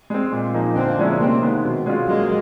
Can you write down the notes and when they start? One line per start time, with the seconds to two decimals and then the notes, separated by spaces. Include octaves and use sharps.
0.10 G#3 C4
0.32 A#2
0.53 F3 A#3 D#4
0.75 D3 A#3 C4
0.98 F3 G#3 C#4 E4
1.19 C3 A#3 C4
1.41 D#3 G#3 B3
1.64 B2
1.86 G#3 C#4 F4
2.07 F#3 G#3 A#3